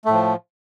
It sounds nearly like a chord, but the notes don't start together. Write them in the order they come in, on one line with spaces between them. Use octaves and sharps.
A3 A2 F3